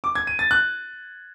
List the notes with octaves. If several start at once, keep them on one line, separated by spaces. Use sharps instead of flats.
D6
G#6
D#7
A6
F#6